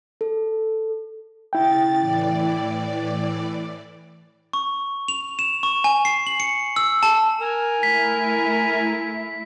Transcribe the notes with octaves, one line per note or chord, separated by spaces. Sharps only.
A4
C#3 E4 G5 A6
A2 E3 D5
C#6
F7
E7
C#6
G#5
C7
F#7
C#7
E6
A5
A#4 G#5
A3 E4 B6